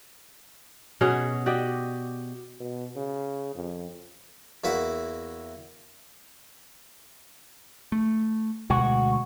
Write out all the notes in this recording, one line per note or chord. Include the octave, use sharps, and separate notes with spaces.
B2 C#4 F#4 G#4
F#4 G4 D5 D#5
B2
C#3
F2
E2 A#3 E4 F#4 E5
A3
D2 B2 G#3 F#4